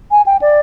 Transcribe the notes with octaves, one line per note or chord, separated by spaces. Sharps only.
G#5
G5
D5